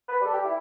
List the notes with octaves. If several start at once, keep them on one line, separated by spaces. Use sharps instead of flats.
B4
G3 A4
G4
E4